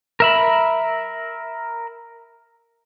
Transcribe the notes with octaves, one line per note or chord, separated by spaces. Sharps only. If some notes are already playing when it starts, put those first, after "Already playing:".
A#4 E5 B5